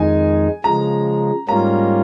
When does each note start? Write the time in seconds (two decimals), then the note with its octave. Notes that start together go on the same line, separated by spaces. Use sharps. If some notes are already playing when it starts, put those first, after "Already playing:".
Already playing: F2 D#3 G#3 D#4 G#5
0.64 C#3 F3 G#3 A#5
1.48 G#2 G3 A#3 C#4 F4 A#5